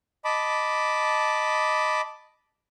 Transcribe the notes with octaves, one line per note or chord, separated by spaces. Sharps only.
D#5 A5 B5 D6